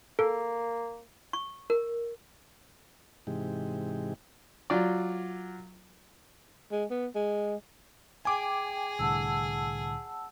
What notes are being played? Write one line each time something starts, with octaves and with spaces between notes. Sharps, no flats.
A#3 A4
C#6
A#4
G#2 C3 E3 G#3 D#4 G4
F#3 F4 D5
G#3
B3
G#3
G#4 G5 G#5 D6
C2 A2 D3 F#5 A5 E6